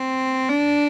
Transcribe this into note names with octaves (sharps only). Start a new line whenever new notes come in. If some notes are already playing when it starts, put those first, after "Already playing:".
Already playing: C4
D4